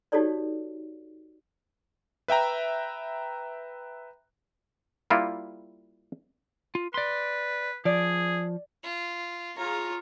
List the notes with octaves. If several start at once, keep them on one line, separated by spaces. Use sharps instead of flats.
D#4 F#4 G4 A4 C#5 D5
B4 E5 G5 A#5
G3 A#3 E4 F4
F4
B4 D5 C6
F3 G#4 D5
F4
F4 G#4 C#5 A#5